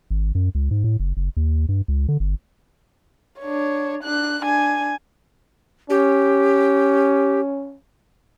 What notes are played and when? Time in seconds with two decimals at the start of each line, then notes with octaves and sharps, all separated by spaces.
0.11 G#1
0.35 F#2
0.55 C#2
0.71 G#2
0.84 A2
1.00 F#1
1.17 F#1
1.37 D#2
1.69 G2
1.88 C#2
2.08 D3
2.20 G1
3.40 D4 C#5
4.04 D4 F#6
4.43 D4 G#5
5.90 C#4 G4